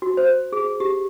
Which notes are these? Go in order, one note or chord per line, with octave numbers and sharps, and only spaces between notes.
F#4
C5
G#4
G4